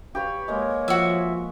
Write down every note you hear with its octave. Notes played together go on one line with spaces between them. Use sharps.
G4 B4 C#5 F5
G#3 A#3 C#5
F3 F#4 E5